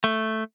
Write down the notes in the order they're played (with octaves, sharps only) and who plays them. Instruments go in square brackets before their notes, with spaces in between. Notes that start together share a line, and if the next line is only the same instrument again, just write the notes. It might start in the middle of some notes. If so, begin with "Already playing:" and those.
[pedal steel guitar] A3